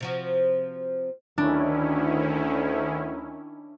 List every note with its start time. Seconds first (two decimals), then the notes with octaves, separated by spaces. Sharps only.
0.01 C3 F3 F#4
1.38 D2 D#3 C#4 D4 E4